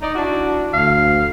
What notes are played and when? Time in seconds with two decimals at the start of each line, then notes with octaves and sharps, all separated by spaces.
0.02 D#4 D5
0.15 D4 E4 F#4
0.73 D2 F5